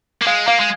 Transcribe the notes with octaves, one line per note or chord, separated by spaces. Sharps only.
A#3
G#3 F5
A#3 F5
G#3